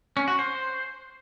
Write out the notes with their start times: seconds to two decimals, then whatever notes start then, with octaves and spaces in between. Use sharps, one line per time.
0.17 C#4
0.28 F#4
0.39 C5